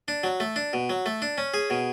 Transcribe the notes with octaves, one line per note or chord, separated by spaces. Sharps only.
D4
F#3
A3
D4
B2
F#3
A3
D4
C#4
G#4
B2